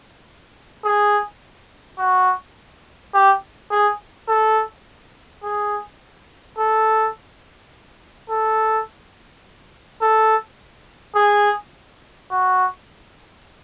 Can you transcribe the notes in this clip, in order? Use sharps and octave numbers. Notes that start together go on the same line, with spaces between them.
G#4
F#4
G4
G#4
A4
G#4
A4
A4
A4
G#4
F#4